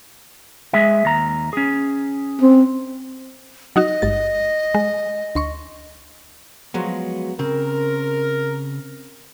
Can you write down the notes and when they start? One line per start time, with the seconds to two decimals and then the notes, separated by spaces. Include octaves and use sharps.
0.73 G#3 G#4 E5
1.05 D#2 A#5
1.53 C#4 G#4
2.41 C4
3.76 F#3 D#4 F#4 D#5
4.02 G#1 G2 A6
4.75 G#3
5.35 D2 C6 C#6
6.74 F3 F#3 G#3 B3
7.39 C#3 C4 A#4